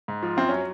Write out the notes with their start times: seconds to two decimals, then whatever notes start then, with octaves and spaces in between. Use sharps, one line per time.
0.08 G#2
0.23 F3
0.37 F#2 C4
0.49 F#3 C#4